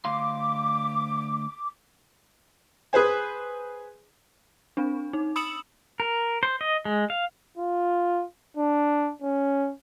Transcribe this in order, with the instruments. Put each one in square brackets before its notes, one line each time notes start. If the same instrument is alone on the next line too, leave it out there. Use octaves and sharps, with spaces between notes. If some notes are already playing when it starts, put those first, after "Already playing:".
[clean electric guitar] D2 F5 C6 [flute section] D6
[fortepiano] G#4 B4 C5 G#5
[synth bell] C4 D4
D#4
B5 D#6 E6 C#7 E7 F#7
[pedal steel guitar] A#4
C5
D#5
G#3
F5
[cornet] F4
D4
C#4